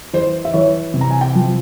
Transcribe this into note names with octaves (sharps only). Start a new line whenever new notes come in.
E3 C5
E5
E3 C#5
C3
A#5
G#5
G5
F3